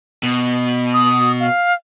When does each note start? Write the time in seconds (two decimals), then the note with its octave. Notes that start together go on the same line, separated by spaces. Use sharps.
0.23 B2
0.94 D#6
1.40 F5